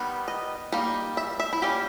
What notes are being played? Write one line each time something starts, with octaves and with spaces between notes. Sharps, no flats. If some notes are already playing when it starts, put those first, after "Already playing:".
Already playing: D#3 G3 B3 D#4
D#5
G3 A#3 D#4
E5
E5
E4
G3 A#3 C#4 G4